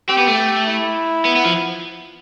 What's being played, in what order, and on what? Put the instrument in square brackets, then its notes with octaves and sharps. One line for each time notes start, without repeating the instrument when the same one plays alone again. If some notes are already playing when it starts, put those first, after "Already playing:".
[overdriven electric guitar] C4 [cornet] G4
[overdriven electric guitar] B3
A3
[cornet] G4
E4
[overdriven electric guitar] B3
B3
F3